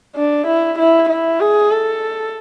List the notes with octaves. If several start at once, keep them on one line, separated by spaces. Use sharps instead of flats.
D4
E4
E4
E4
G#4
A4